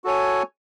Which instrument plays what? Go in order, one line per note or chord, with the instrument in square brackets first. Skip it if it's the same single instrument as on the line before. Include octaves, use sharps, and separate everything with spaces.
[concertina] F#4 A4 C#5 G#5